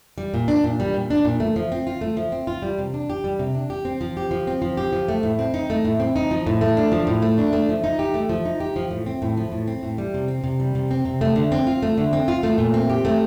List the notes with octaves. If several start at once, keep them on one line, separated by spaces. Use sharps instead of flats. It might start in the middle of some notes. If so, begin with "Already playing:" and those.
G3
A#2
D4
A#2
G3
A#2
D4
A#2
A3
F3
C4
F4
A3
F3
C4
F4
G3
C3
D4
G4
G3
C3
D4
G4
C4
F3
G4
F3
C4
F3
G4
F3
A3
A2
C4
D#4
A3
A2
C4
D#4
F3
A2
A3
D4
F3
A2
A3
D4
A3
F3
D#4
G4
A3
F3
D#4
G4
F3
A2
C4
A2
F3
A2
C4
A2
G3
C3
C4
C3
G3
C3
C4
C3
A3
D3
C4
F4
A3
D3
C4
F4
A3
A#2
C4
G4
A3